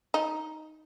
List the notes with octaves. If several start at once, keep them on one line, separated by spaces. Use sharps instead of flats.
D#4